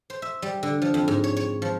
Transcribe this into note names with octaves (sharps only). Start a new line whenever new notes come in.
C5
E5
G3
D3
F3
F2
G#2
C#5
C#5
F3